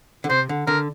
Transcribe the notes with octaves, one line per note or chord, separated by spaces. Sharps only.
D3
C3 C5
D3
D3 A#4